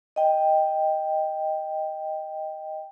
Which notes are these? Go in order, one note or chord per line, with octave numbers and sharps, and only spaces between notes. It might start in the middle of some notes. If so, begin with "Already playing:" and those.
D#5 G5